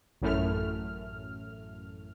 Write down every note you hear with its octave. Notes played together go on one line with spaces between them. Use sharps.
A1 F#2 A2 A3 F6